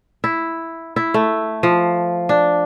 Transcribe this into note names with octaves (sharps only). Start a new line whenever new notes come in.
E4
E4
A3
F3
D4